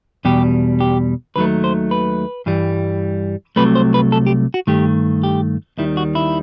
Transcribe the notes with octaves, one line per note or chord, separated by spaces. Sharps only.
E2 B2 G3 G4
G4
D#2 D#3 F#3 A3 B4
C5
B4
G2 E3 G3
C2 C3 F#3 A3 B4
C5
B4
A4
G4
F#4
G2 D#3 A3 G4
G4
D#2 D#3 G3 E4
F#4
E4